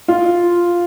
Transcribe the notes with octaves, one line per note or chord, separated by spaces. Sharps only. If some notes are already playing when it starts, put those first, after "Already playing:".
F4